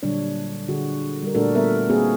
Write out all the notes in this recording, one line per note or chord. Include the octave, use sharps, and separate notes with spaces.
A#2 D3 F#3 G3 D4 C#5
D3 F#4 G#4
G3 A#4
A#2 A3 D4 F#4 A4 A#4
G3 B3 A#4 E5
A#3 C4 F#4 G#4 B4